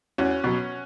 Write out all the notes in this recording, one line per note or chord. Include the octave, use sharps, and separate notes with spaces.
E2 C#4 F#4
B2 F#3